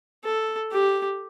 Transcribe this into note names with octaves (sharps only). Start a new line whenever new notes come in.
A4
G4